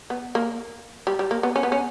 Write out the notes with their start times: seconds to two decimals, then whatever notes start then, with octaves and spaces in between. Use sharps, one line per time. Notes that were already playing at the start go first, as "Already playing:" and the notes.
0.10 B3
0.35 A#3
1.07 G3
1.19 G3
1.31 A#3
1.43 B3
1.56 C#4
1.63 B3
1.72 C#4